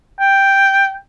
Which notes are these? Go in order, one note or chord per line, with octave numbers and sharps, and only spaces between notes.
G5